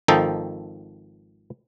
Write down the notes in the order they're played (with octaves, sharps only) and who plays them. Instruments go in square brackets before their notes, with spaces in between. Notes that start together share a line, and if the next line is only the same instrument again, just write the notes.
[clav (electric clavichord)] G#1 D#3 F3 D#4 A4 G5